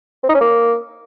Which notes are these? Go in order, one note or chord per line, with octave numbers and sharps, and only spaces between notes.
C4
D#4
C#4
A#3